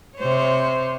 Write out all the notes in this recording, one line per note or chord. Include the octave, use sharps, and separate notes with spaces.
C3 C5 C#5